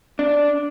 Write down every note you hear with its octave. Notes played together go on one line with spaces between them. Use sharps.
D4